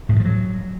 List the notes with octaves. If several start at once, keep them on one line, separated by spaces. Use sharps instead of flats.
A2
E3
F3
F#3